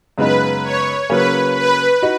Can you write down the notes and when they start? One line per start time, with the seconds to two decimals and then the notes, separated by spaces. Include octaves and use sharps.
0.18 F#2 C#3 G#3 B3 D#4 B4
0.63 C#5
1.09 C#3 F#3 A#3 C#4 B4
1.56 B4
2.02 D#4 F#4